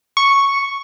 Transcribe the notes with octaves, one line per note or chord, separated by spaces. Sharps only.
C#6